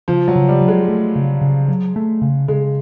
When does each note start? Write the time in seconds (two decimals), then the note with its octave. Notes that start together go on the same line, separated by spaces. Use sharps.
0.08 C#3 F3
0.28 F#3
0.36 C#3
0.48 G3
0.61 F#3
0.68 G#3
0.88 A3
1.16 C#3
1.41 C#3
1.68 F#3
1.96 A3
2.22 C#3
2.48 C#3 G#3